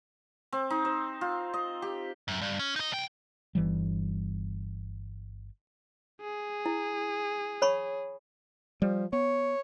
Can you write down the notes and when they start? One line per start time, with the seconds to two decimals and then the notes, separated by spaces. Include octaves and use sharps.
0.52 C4
0.70 D#4
0.85 C5
1.21 F4
1.54 D#5
1.82 G4
2.28 F#2
2.41 G2
2.59 C#4
2.76 D#4 D#5
2.91 B1 G5
3.55 G1 E3 G3
6.21 G#4
6.66 E4
7.62 C#5 B5 C#6
8.82 F3 G3
9.13 B3 C#5